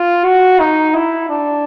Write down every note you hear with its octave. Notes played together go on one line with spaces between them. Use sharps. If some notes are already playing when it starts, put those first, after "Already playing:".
Already playing: F4
F#4
D#4
E4
D4